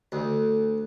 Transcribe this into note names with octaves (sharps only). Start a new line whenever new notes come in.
D2